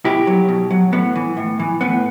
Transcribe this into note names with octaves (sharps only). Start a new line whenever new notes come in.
B2 E4 G4
F#3
B2
F#3
A2 B3
E3
A2
E3
A2 B3